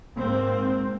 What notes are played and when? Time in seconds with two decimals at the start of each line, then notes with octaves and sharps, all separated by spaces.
0.16 G#2 A#3 C4